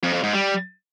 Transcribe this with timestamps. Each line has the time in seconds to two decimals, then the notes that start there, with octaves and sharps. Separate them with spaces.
0.03 F2
0.13 F2
0.23 G#2
0.33 G3